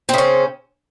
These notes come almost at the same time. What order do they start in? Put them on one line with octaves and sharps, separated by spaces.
C4 C#3 C#4